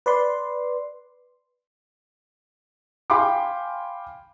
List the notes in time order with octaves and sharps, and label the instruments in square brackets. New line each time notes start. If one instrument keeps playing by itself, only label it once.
[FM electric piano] B4 D5 C6
[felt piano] F5 G5 G#5 B5 C6 D6